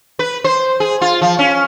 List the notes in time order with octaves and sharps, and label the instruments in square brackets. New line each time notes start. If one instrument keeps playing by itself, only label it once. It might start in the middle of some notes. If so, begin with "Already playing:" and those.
[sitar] B4
C5
G#4
F4
F3
C#4